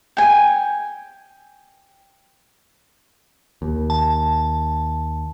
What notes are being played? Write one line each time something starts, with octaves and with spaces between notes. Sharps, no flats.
G5 G#5
D#2
A5